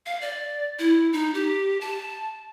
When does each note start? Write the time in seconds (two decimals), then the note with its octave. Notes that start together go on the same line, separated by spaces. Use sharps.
0.06 F5
0.21 D5
0.79 E4
1.13 D#4
1.34 G4
1.81 A5